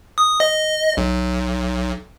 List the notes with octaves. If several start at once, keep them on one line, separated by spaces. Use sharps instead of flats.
D#6
D#5
B1